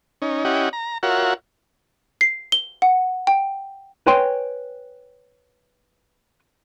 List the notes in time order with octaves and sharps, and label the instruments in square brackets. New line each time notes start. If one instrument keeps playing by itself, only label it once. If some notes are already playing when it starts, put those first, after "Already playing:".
[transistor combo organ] C#4 D#4
C#4 E4 G4 D#5 F#5
A#5
F4 F#4 A#4 C#5 E5 F#5
[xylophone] C7
G7
F#5
G5
[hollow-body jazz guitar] B4 C#5 G5 G#5 C6